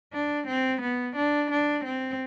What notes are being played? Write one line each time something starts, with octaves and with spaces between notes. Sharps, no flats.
D4
C4
B3
D4
D4
C4